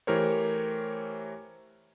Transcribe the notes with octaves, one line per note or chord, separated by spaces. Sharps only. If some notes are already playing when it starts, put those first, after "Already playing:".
E3 A3 G4 A#4 C5 C#5